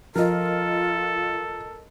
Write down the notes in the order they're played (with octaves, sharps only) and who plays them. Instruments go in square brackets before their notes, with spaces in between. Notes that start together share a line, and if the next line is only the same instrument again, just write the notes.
[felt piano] F3 [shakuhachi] F4 [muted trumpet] A4 [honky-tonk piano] A#4 D#5